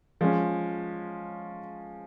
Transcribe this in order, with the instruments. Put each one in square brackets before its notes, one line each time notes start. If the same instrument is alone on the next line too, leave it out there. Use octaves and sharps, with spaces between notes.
[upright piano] F3 G#3 C#4